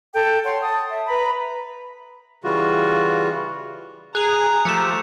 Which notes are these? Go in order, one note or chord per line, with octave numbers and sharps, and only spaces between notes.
A4 G5
C#5 F#5 C6
A5 D#6
E5
B4 A#5 B5
C#3 E3 G3 F4 F#4
G#4 A#5 F#6 F7
F3 A3 G4 A4 C#7 E7